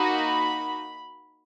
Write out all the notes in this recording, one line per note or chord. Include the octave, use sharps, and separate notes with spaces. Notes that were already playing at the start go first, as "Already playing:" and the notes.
Already playing: A#3 D#4 F#4 B5